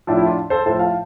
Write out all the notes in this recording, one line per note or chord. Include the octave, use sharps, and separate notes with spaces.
A2 F3 D4
E4
D4 F4
A4 C5
A2 F3 A4 C5
F5 A5